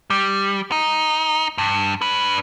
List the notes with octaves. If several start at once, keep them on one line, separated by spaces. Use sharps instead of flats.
G3
D#4
G2
D4 B4